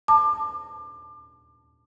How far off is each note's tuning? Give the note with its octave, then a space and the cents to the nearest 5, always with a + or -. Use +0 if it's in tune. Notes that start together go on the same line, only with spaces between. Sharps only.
A5 +0 D6 +30